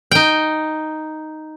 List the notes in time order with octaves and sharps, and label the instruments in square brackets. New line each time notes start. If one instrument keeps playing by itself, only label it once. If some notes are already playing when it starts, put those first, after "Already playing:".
[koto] D#4 G5